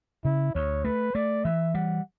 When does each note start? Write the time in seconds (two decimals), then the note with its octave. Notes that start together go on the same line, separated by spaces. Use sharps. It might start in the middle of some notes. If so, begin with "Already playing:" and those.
0.25 C#3 E4
0.55 D2 C#5
0.85 A3 B4
1.15 A3 D5
1.45 E3 E5
1.74 G3 F#5